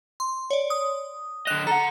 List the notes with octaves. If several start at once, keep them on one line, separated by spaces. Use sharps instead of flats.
C6
C#5 D5
D#6
D3 D#5 F#6 E7 F7
A4 F#5 A#5